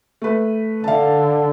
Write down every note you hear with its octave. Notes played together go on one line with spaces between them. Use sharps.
A3 B4
D3 F5 A5